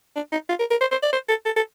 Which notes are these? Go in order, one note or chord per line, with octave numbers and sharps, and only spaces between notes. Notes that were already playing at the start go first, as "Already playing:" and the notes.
D4
D#4
F4
A#4
A#4
C5
C5
D5
C5
A4
A4
A4